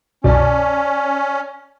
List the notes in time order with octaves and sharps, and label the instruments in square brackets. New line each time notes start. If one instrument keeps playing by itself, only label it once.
[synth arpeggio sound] C2 F#2 B2 [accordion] C#4 [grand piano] D5 A5